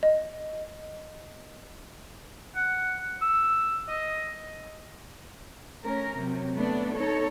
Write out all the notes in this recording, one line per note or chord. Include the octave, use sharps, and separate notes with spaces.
D#5
F#5
E6
D#5
A3 C#4 A#4
C3 F#3
A3 B3 D4
D#4 A4 C#5